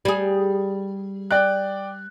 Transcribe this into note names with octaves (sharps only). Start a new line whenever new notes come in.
G3 G#4
D5 G5 F#6